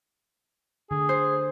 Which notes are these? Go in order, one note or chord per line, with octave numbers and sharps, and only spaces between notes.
D3 G#4
C5